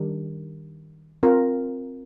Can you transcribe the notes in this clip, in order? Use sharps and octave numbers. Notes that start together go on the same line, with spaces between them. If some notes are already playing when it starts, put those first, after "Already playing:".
Already playing: D#3 G3 D4 G4 A#4
C4 F4 A#4